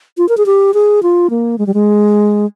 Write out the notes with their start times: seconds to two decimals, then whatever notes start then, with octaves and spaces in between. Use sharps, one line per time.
0.18 F4
0.29 A#4
0.37 G#4
0.46 G4
0.74 G#4
1.03 F4
1.30 A#3
1.58 G#3
1.67 G3
1.74 G#3